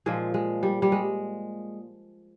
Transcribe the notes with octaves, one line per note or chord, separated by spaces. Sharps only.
A#2 F3 G#3
G#3
G3
G3
G#3